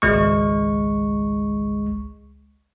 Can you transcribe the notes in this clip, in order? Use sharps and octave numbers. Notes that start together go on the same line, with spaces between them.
G#1 C#2 G#3 C#6